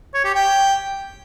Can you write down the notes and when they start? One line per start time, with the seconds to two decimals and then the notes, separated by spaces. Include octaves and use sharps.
0.14 C#5
0.24 G4
0.34 G5